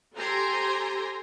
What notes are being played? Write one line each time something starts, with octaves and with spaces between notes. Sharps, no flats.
G4 A4 C5 G#5 A#5 C6